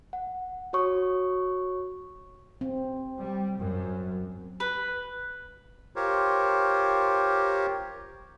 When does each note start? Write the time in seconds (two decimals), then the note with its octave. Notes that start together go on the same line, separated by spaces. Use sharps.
0.13 F#5
0.73 F#4 C#5 C#6 D#6
2.61 C4
3.19 G3
3.58 F#2
4.60 B4
5.96 F4 G4 A#4 C5 C#5